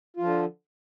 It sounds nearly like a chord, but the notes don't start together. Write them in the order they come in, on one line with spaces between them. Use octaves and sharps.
F4 F3 D3